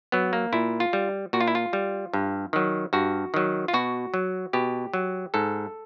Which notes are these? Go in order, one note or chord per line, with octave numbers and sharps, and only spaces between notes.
F#3 B3
A#3
A#2 E4
F4
G3
A#2 F#4
F4
E4
F4
G3
G2
D#3 F#3
G2 F#4
D#3 F#3
F4
B2 F#4
F#3
B2 G4
F#3
G#2 A4